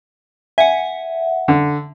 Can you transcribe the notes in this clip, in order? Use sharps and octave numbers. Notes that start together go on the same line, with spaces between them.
E5 F#5 G#5
D3